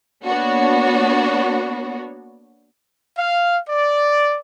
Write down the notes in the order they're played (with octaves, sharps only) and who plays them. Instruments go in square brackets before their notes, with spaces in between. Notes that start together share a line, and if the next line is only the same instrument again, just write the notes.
[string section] A#3 B3 D4 F#4 C#5
[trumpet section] F5
D5